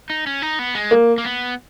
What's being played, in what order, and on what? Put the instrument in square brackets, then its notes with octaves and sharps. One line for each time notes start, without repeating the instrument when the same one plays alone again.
[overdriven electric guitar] D#4
C#4
D#4
B3
G#3
[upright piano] A#3
[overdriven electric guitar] A#3
B3